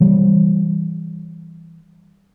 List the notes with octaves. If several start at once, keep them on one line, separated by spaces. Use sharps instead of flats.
E3 G3